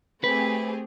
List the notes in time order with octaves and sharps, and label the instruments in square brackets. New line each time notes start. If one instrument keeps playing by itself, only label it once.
[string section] A3 [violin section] C4 G4 G#4 [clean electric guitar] B4